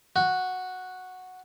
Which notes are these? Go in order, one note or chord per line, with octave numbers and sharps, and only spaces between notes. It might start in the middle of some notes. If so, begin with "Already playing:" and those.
F#4